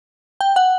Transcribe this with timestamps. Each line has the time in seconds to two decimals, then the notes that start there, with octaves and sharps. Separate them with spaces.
0.41 G5
0.56 F#5